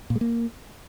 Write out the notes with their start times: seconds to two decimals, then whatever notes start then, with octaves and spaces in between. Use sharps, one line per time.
0.10 A#2
0.16 G#3
0.21 A#3